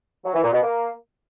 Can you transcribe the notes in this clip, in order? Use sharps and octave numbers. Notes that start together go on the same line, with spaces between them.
F#3
E3
A#2
B2
A#3